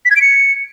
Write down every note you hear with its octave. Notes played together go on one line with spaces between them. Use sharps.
B6
G#6
D7
C#7